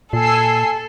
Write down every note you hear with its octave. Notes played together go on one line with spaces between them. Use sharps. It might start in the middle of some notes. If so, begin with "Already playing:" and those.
A#2 A4 G#5 E6 C7